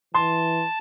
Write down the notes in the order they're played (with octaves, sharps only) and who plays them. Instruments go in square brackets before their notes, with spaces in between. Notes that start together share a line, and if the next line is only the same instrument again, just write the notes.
[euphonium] E3 [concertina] A5 [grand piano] C6